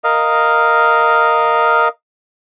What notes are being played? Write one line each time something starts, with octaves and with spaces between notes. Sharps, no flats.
A#4 D#5 F5